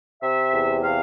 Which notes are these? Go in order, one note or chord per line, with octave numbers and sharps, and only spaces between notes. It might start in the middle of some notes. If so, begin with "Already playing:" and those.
C3 E5
E2
C3 F5